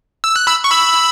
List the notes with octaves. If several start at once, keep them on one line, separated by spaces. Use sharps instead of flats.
E6
F#6
B5 E6
C#6
B5 E6